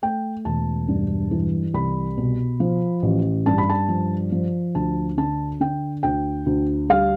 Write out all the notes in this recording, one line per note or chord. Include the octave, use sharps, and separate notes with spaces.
A3 G5
E1 A5
G2
E3
C2 B5
B2
F3
A1
G2 A5
B5
A5
F3
F3
D2 A5
D3 A5
D3 G5
D2 G5
D2
G3 F5